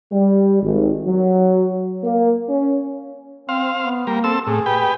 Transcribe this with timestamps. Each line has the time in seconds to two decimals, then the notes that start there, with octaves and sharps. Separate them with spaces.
0.12 G3
0.62 G#1
1.06 F#3
2.04 A#3
2.49 C#4
3.49 C4 C5 F5
3.84 B3
4.07 G3 A#3 A#4
4.24 C4 A4 E6
4.47 A2 G#4
4.66 G4 B4 G5